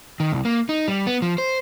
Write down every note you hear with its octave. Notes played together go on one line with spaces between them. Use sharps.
D#3
C2
A#3
D#4
G3
B3
F3
C5